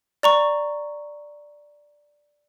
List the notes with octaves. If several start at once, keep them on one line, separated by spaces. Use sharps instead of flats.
D5 A#5 C#6